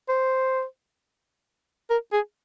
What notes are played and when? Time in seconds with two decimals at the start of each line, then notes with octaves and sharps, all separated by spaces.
0.09 C5
1.90 A#4
2.13 G#4